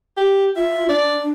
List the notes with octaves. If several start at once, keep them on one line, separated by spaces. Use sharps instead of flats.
G4
F4 E5
D4 D5